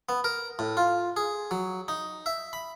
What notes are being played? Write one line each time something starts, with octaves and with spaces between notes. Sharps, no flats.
B3
A#4
A2
F4
G#4
F#3
D#4
E5
B5